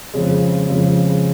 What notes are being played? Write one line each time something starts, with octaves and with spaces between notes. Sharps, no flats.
F2 C#3 G#3
F2 C#3 G#3